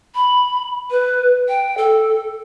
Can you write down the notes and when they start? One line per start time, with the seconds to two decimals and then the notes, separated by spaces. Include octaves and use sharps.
0.15 B5
0.91 B4
1.49 G5
1.78 A4